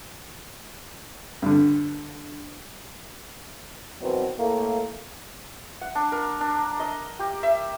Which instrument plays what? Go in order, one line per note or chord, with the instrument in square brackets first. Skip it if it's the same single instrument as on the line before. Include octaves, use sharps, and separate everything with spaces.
[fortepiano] G2 D3
[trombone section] B2 D#3 E3 F#3 C4
A2 A3 A#3
[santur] F#5
D4
A#4
D4
D#5
G4
E5